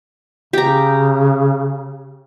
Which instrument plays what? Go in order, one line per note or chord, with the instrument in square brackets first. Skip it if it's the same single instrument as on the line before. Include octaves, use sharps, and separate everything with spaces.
[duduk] C#3 [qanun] G4 A#5